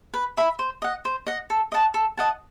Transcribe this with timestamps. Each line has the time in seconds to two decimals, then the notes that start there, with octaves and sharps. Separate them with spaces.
0.14 B4
0.37 E5 B5
0.59 C5
0.82 D#5 F#5
1.05 C5
1.27 D#5 F#5
1.50 A4
1.72 D#5 F#5 A5
1.94 A4
2.17 D#5 F#5 A5